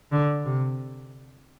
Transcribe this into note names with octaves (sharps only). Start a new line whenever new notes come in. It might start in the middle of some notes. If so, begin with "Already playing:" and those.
D3
C3